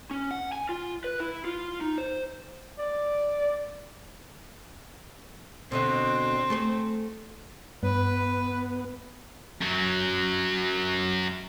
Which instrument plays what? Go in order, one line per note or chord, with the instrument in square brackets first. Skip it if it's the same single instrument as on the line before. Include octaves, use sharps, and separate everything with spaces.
[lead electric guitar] C#4
F#5
G#5
F4
B4
E4
F4
D#4
C5
[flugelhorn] D5
[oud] B2 D3 E4 [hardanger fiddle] C4
[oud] A3 G#4 C5
[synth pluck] G2 [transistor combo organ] B3 [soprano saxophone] B4
[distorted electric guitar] F#2 F#3